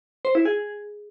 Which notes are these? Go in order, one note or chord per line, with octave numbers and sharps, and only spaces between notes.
C5
E4
G#4